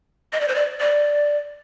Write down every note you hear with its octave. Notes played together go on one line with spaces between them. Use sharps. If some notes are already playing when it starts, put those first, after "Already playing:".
D#5
D5
C5
D5
D5